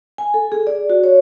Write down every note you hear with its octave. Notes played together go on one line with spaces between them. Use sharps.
G#5
A4
G#4
D5
F#4
C#5